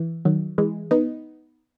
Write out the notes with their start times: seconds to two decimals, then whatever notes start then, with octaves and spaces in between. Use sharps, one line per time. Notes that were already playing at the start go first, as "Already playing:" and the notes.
Already playing: E3
0.25 D#3 F#3
0.58 E3 G#3
0.91 B3 D#4